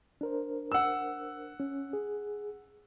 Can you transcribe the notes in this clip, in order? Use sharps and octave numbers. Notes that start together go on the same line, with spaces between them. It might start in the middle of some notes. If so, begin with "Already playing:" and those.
D4 A#4 C5
F#5 E6
C#4
G#4